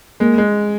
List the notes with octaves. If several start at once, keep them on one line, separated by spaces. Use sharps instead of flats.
G#3 A#3
G#3